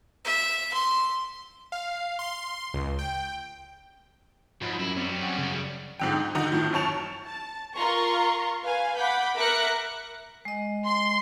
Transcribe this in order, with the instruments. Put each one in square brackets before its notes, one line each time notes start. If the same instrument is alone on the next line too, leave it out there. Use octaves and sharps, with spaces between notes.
[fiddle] E5
C6
[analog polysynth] F5
C6
C#2
G5
[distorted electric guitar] G#2 [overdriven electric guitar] F3 F#3 [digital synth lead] B5
[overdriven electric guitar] F#2 [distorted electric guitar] E4
[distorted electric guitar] G3 C#4 [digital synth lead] C4
[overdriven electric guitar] F#2 F#4
[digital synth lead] C#3
[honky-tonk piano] G#2 D3 G5
D#4
D3 D#3 D#4 F#4
F2 A2 D#3
F#2 C#5 A5 F7
[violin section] A5
F4 A#4 A#5 C6 C#6
B4 F5 G#5
F#5 B5 D6 G6
A#4 E5 D6 F#6 A#6 C#7
[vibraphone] G#3 D#5
[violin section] C6